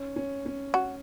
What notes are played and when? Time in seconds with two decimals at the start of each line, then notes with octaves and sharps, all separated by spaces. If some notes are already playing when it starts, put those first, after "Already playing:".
Already playing: C#4
0.16 C#4
0.46 C#4
0.74 F#4